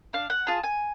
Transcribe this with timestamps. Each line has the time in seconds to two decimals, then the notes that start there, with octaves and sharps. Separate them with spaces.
0.13 D4 F5
0.30 F#5
0.47 F4 G#4 A5
0.64 G#5